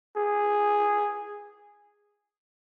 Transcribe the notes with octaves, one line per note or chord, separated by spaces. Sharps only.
G#4